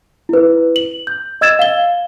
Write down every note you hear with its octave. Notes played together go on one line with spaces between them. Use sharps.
E4 B4
F#7
G6
D#5 E6 G#6 A6 E7
F5 G7